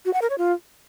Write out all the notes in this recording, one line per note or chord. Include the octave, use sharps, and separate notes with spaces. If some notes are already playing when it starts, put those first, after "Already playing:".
F#4
F#5
A#4
C#5
F4